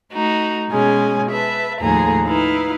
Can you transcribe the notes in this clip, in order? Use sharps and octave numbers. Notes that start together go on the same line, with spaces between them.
A3 D#4 F#4
B2 G#3 C#4 G#5
B4 E5 A5
D#2 A2 F3 G#4 A4 A#5
D#4 E4 B4 F5